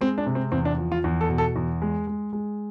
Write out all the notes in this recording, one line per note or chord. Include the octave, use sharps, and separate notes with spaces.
G#3 C4
D4
C3
C4
E2 C4
D4
F3
F4
E2
A4
B2
A4
E2
G#3
G#3
G#3